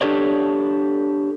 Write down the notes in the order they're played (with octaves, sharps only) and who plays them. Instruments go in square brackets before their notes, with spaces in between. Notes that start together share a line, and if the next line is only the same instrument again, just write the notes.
[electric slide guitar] D4 G4 A4 C#5 D5